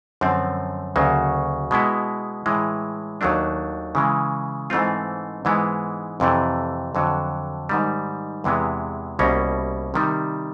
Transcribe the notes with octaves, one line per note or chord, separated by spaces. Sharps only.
F#2 D3 F3 A3 C4
D2 C#3 F#3 A#3
B2 G#3 B3 E4
A2 E3 G#3
D#2 D#3 F#3 A3 D4
C#3 E3 G#3
G#2 E3 A3 C4 F4
G#2 E3 G#3 B3
F2 C3 E3 A3
F2 D3 F#3
G#2 D#3 G3
E2 C3 E3 G#3 B3
C2 B2 G3 A#3 C#4
C3 D#3 G3